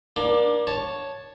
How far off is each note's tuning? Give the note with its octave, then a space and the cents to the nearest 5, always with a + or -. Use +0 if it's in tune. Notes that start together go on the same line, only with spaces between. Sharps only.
A#3 +35 D4 +10
C#5 +0 A5 -5